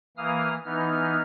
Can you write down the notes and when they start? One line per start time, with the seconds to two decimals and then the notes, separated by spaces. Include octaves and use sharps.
0.17 E3 A#3 F5 D#6 F6
0.65 E3 B3 D#4 F6